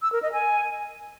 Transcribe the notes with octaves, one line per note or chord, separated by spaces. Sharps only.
E6
A#4
D#5
G#5